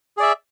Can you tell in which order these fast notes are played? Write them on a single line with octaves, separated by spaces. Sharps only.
G#4 D5 E5